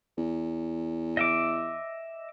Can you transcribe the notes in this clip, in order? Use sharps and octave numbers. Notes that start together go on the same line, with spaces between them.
E2
D#5 E5 D6